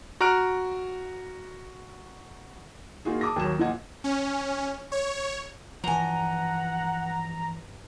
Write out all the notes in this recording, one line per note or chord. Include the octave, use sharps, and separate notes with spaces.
F#4 A#5 F6 F#6 D7
A#3 D#4 F4 F#4 G#4
A5 D6 D#6 A#6
D#2 F#3 E7
A#2 F3 F4 D#5 F#5 G#6
C#4
C#5
G2 E3 F3 F#5 G#5 A#5